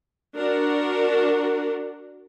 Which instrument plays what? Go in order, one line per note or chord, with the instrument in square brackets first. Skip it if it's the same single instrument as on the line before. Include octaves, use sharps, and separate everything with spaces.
[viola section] D4 F#4 A#4